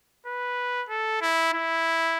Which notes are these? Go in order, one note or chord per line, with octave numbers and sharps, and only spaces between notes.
B4
A4
E4
E4